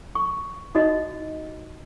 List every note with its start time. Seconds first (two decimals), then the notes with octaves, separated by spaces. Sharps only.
0.15 C#6
0.75 D#4 F#4 D#5